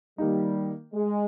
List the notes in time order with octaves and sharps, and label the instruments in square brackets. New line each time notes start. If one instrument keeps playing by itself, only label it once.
[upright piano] D#3 A#3 D#4 [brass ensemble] G3
[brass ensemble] G#3